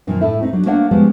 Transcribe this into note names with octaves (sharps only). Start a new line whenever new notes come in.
F#2 A#2 D#3 F3
A2 A3 E4
A3 C4 D#4
F#3 D4
A3 A#3 D4 C#5 F5 F#5
F3 G3 G#3 B3 C#4